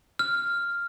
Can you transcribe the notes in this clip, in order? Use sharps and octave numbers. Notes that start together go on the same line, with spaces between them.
F6